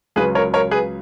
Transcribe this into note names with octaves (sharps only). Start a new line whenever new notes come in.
C#2 C#3 F#3 G#4 B4
A#4 C#5
A#4 C#5
G#4 B4